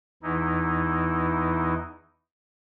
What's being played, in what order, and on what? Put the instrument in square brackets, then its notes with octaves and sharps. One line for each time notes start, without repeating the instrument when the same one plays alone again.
[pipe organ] E2 E3 D#4 E4